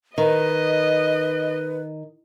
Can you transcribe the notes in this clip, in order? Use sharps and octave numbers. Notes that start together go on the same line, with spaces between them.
D#3 B4 D#5